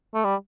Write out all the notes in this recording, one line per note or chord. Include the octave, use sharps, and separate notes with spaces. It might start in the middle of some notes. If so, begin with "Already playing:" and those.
A3
G3